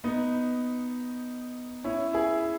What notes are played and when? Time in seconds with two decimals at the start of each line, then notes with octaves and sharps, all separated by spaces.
0.04 B3 D#4
1.84 C#4 E4
2.13 E4 G#4